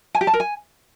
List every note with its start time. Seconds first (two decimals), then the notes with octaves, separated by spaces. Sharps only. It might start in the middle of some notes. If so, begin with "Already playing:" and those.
0.15 G#5
0.21 G4
0.27 A5
0.33 A#4
0.40 G#5